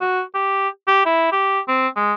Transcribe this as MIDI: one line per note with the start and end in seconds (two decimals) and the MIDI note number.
0.01 0.22 66
0.35 0.68 67
0.87 1.03 67
1.06 1.29 64
1.32 1.60 67
1.68 1.88 60
1.96 2.13 56